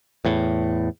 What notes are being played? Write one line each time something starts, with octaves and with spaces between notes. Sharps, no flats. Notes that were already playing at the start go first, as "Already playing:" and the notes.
E2 A2